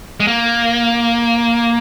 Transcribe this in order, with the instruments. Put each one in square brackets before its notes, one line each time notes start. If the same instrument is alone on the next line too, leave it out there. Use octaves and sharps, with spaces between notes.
[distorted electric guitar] G#3
A#3